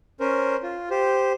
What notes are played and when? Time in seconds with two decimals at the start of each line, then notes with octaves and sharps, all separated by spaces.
0.20 C#4 A#4 C5
0.63 F4
0.90 G4 C5